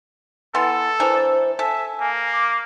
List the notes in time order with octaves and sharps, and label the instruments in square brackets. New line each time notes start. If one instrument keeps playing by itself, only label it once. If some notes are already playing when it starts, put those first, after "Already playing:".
[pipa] E3 B3 C6 [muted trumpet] A4
[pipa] E3 D4 A#4 [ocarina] C5
[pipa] A4 [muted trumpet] E5 [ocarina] G#5
[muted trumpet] A#3
[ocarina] D6